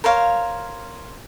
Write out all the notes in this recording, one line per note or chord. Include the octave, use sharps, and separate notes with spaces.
A#4 C5 C#5 F5